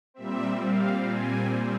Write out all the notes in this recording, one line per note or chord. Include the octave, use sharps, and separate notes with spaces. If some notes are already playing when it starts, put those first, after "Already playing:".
A#2 G3 C4 E5
F5
G#5